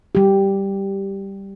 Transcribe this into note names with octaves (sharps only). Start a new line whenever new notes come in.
G3 G4